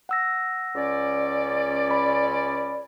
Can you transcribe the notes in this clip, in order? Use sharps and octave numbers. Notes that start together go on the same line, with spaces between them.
F#5 E6 A#6
C#2 C#4 D5
B5